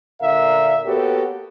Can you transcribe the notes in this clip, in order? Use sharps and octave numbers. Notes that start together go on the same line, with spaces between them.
A#2 D3 A#4 E5 F5
A#3 B3 F#4 G4 A4 C#5